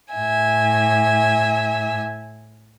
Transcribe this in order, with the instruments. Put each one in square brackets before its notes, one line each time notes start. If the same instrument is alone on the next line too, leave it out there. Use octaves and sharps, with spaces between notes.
[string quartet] A2 E5 G#5